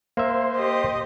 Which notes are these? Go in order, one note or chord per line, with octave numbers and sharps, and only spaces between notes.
A#3 C5 E5
G4 D#5